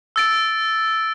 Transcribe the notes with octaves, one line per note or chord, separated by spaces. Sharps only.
E6 A6 D7